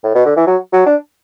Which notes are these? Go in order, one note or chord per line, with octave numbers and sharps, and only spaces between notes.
A2
B2
D3
E3
F#3
F#3
D4